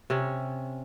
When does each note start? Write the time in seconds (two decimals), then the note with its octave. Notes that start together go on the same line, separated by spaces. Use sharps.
0.10 C3 C#4